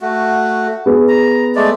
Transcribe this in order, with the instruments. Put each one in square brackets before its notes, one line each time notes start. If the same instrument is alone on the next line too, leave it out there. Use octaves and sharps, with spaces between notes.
[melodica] A3 F#4
[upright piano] B3 G#4
[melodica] A#5
G#3 A3 D5